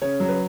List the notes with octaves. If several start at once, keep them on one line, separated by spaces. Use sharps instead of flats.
C#3 C#5
F#3
B4